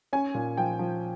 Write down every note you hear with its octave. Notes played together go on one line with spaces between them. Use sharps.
C#4 G#5
A#2
F3 G5
F3